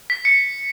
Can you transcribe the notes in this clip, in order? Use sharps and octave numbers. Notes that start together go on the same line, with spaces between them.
B6
C#7